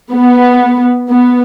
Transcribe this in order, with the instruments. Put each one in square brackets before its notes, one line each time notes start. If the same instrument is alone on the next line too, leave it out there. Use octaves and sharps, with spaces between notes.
[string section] B3
B3